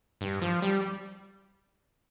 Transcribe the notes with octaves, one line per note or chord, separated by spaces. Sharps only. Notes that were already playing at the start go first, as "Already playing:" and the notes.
G2
F3
G3